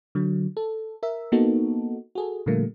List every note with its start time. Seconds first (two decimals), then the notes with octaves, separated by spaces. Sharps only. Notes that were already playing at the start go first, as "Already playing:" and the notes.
0.15 D3 F#3
0.57 A4
1.03 A#4 E5
1.32 A#3 B3 D#4 F#4 A4
2.15 F#4 G#4 A4
2.46 A#2 D3 F3 G3 A3 A#3